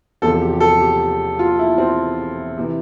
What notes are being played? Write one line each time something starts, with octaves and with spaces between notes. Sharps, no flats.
E1 E2 C3 F3 A4
G4
G4
A4
G4
F4
E4
C4
C3 E3